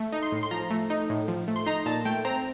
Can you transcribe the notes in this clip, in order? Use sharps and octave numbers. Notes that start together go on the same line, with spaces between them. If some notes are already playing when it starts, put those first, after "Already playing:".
Already playing: A3
D#4
C6
A2
C6
F3 A#5
A3
D#4
A2
F3
A3
C6
D#4 A#5
A#2 A5
A3 G5
C4 A#5